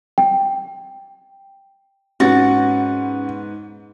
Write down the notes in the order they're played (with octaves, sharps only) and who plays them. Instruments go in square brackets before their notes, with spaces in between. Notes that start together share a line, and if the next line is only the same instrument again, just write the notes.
[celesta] G5
[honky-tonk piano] G#2 B3 A6 [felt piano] C#4 [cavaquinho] F#4